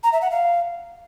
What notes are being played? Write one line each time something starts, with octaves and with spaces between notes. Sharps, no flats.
A#5
E5
F#5
F5